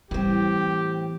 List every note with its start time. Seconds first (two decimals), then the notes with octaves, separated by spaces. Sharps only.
0.11 A2 E3 G3 C4 G4